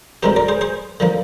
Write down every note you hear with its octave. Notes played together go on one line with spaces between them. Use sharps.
D2 D3 G#3 C4 G4 A#4
A#4 D5
G#4 C5
G#4 C5
D3 F3 A#3